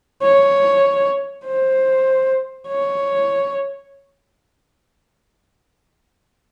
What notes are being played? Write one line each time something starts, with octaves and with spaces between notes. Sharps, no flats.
C#5
C5
C#5